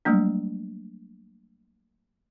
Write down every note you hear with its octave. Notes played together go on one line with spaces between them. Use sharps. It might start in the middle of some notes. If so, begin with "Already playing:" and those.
F#3 G3 A3 A#3 D4